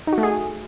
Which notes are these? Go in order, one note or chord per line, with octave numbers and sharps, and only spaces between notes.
D#4
F#4
A3
G#4